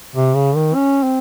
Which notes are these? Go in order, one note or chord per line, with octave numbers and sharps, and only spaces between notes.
C3
C#3
D#3
C#4
C4